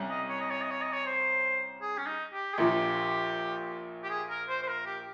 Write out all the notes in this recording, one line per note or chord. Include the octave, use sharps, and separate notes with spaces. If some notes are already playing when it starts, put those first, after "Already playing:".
Already playing: C2 G3 C#4
D#5
C#5
D#5
C#5
D#5
C#5
D#5
C#5
C5
G#4
C#4
D#4
G4
G#4
A#1 A#2 F3 G4
G4
G#4
A#4
C5
C5
A#4
G4